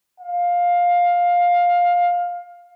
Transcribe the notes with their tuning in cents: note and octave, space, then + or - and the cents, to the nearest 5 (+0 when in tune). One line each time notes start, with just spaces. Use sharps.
F5 +15